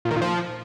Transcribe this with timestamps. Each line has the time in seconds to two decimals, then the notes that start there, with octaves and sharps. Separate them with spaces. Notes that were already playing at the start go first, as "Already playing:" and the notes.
0.05 A#2
0.11 D#3
0.16 A#2
0.22 F3